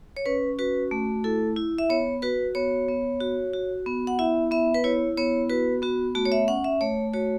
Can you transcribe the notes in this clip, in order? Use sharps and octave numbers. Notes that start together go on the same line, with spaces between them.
C#5
C#4 B4
F#4 B4
A3
E4 A4
E4
E5
B3 C#5
F#4 B4
B3 C#5
B3
F#4
F#4
B3
F#5
E4 E5
B3 E5
B4
E4 C#5
B3 C#5
F#4 B4
B3 F#4
A3 F#4
C#5
E5
C#4 F#5
E5
A3 C#5
F#4 C#5